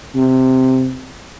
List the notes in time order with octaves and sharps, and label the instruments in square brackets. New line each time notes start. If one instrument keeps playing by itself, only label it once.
[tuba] C3